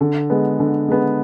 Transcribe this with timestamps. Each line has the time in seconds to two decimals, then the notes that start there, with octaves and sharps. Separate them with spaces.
0.01 D3
0.30 G#3 B3
0.60 D3
0.88 G#3 B3